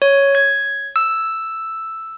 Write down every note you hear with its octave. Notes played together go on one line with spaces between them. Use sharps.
C#5
G#6
E6